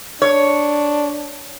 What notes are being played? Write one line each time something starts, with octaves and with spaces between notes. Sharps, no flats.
D4 C#5